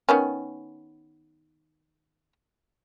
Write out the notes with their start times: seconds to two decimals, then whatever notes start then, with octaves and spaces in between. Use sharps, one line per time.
0.09 D#3 B3 C#4